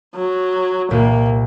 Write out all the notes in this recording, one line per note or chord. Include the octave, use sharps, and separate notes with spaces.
F#3
C2 A#2 A#3